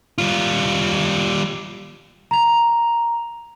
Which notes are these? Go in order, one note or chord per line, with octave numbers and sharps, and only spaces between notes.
G3 F4
A#5 F7